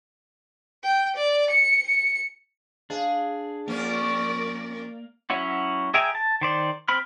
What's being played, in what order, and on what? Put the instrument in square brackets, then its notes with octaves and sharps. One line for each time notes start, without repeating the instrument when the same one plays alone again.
[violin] G5
D5
C#7
C#7
[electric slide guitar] D4 [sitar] G#4 [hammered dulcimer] F5
[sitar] F2 C#4 [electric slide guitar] A#3 [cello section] A#4 D5
[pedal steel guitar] F#3 C#4 E4 F#4
G#4 E5 G5 G#5 A#5
A5
D#3 C5 D5
C4 B5 F6